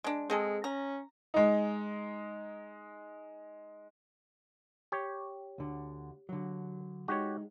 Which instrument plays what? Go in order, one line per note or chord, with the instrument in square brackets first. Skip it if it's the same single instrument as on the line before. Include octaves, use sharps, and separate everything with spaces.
[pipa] G#3 D4
[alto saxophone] G#3 [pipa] C4 G#4 A4
[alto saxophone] C#4 [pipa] A#5
[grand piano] G#3 D#4
[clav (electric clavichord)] G4 C#5
[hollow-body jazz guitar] D2 D3
D3 F#3
[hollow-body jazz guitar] G#3 D#4 [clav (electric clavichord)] F#4 G4 C#5